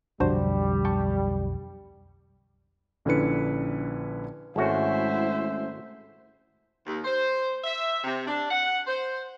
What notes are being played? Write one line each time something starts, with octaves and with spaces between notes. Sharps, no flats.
B1 F2 D3 G3 D4 F#4 C5
G5 A5 C#6
A#1 D3 C#4 E4 B4 C#7
G#1 G#3 A3 C#4 E4 F#4 C5 E5
D#2
C5
E5
C3
D4
F#5
C5